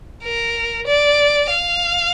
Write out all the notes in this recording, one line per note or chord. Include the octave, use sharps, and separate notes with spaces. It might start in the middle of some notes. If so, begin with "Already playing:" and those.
A#4
D5
F5